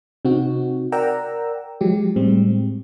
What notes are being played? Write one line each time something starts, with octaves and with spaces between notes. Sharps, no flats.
C3 C4 D#4 F#4
A#4 D5 F#5 G5 A#5 E6
F3 F#3 G#3 G4
A2 G3 G#3 C4